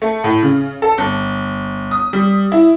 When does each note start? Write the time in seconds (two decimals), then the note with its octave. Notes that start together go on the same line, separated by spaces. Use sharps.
0.02 A3
0.24 A2
0.43 C#3
0.82 A4
0.98 G1
1.91 D#6
2.13 G3
2.52 E4